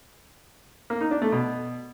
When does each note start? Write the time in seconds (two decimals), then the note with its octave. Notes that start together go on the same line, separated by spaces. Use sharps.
0.90 A#3
1.01 D#4
1.11 D4
1.22 A3
1.32 B2